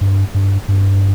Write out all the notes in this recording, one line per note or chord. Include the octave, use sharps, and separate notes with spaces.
G2
G2
G2